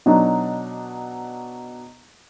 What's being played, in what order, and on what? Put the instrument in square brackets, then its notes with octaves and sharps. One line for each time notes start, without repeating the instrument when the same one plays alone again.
[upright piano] B2 F#3 D4 D#4